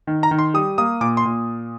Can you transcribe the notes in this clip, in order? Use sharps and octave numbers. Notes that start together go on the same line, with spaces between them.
D#3
A#5
D#3
C6
G3 D#6
A#3 D#6
A#2 D6
C6
A#2